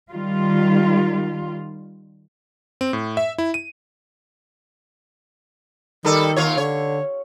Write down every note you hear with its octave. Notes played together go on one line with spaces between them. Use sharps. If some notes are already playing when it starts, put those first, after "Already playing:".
D#3 G3 F4
C4
A2
E5
E4
D#7
D#3 G3 A4
D#2 F4 C#5
D3 C#5